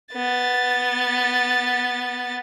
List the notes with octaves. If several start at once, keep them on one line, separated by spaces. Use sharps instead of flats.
B3 A6